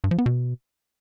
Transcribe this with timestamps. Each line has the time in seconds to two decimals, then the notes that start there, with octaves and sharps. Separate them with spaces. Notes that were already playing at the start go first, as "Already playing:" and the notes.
0.04 G2
0.11 F3
0.18 B3
0.26 B2